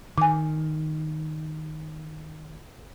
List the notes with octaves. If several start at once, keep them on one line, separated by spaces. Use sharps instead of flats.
D#3 G#5 D6